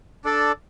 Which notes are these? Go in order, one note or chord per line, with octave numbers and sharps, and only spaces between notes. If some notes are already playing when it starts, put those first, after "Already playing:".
D4 A4 D5